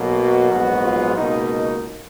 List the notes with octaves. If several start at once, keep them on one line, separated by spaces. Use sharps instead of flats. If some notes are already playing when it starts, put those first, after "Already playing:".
Already playing: B1 B2 F#3 A#3
F#4
A#1 G#2 F#3 B3
F4
C#2 B2 A#3 D#4